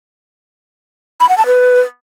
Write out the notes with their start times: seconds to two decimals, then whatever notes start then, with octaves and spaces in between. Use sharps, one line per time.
1.20 B5
1.29 F#5
1.38 A5
1.46 B4